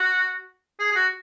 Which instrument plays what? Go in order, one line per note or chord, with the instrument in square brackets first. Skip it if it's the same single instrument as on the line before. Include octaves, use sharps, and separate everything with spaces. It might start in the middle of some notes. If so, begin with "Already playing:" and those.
Already playing: [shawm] F#4
G#4
G#4
F#4